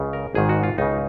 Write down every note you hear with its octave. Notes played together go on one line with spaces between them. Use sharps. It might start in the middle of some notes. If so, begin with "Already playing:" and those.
Already playing: C#2 C#3
A#4
G#1 G#2 D#3 G#4
F#4
F4
C#2 C#3 D#4